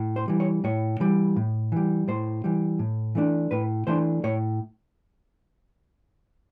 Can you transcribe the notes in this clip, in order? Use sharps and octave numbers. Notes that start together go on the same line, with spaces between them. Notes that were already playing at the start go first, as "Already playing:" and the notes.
Already playing: A2
C5
E3 G3
C#5
A2 C#5
E3 G3
A2
E3 G3
A2 C5
E3 G3
A2
E3 A3 D4
A2 B4
E3 A3 D4 C5
A2 C#5